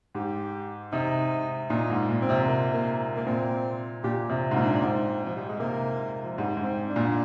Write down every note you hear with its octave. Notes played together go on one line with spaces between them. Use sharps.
G#2 G4
C3 D#4
A#2 D#4
G#2
A#2
C4
C3
A#3
A#3
A#3
A#2 C4
A#2 G4
C3
G#2
A#2
D4
D4
G#2 C4
F3
G3
G#3
C3 A#3
F3
G#2 G3
G#2
C4
D4
A#2